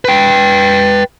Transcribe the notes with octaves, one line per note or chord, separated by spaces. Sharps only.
B4 G5